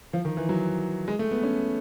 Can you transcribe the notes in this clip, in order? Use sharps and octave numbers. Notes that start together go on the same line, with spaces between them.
F3
D#3
E3
F#3
G#3
A3
B3
C#4